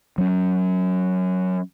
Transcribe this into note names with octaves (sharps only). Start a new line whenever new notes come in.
F#3 C#4